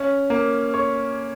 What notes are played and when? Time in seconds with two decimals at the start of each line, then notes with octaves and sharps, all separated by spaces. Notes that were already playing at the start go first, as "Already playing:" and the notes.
Already playing: C#4
0.30 A#3
0.74 C#5